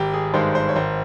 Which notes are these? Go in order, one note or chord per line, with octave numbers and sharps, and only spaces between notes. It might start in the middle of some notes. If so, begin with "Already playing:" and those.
Already playing: G#1 G4
G#4
G2 D#3 G#3 C5
C5
C#5
G#1 C5